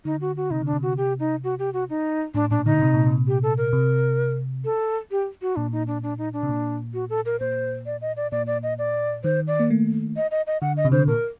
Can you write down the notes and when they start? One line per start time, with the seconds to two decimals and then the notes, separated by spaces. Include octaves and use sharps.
0.05 D3 D#4
0.21 F#4
0.37 F#4
0.51 C3 D#4
0.62 D3 D4
0.73 C3
0.83 F#4
0.97 G4
1.20 D#4
1.44 F#4
1.59 G4
1.73 F#4
1.90 D#4
2.34 A2 D4
2.50 A#2 D4
2.66 D3 D#4
2.82 C3
2.94 A#2
3.07 C3
3.28 G4
3.43 A4
3.58 A#4
3.73 C3
4.65 A4
5.11 G4
5.42 F#4
5.56 A#2 D4
5.72 D#4
5.87 D4
6.03 D4
6.18 D#4
6.33 D4
6.43 C3
6.49 A#2
6.94 F#4
7.10 A4
7.26 A#4
7.40 A#2 C5
7.86 D5
8.02 D#5
8.17 D5
8.32 A#2 D5
8.47 D5
8.63 D#5
8.79 D5
9.24 D#3 C5
9.47 D5
9.60 A#3
9.70 A3
10.16 D#5
10.31 D#5
10.47 D#5
10.62 D3 F#5
10.77 D#5
10.85 C3
10.92 D3 C5
10.99 C3
11.07 A#2 A#4